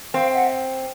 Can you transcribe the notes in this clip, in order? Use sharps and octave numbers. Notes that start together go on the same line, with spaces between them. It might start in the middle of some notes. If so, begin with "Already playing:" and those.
C4 F5 G5
E5 F#5